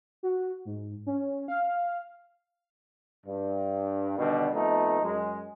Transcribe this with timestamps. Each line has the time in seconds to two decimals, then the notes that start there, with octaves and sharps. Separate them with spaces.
0.23 F#4
0.65 G#2
1.07 C#4
1.48 F5
3.26 G2
4.17 B2 D3 D#3 G3
4.52 F2 A3 B3 D#4
5.03 F#2 G#3